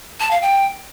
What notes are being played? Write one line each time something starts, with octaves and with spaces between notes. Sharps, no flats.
A5
F5
G5